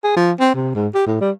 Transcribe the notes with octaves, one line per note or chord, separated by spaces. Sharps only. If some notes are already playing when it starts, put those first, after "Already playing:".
G#4
F3
C4
C3
G#2
G4
A2
G3